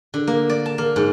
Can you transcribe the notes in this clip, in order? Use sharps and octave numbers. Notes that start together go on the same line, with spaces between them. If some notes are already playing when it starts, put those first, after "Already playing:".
D3
A#3
D5
A5
A#3
G#2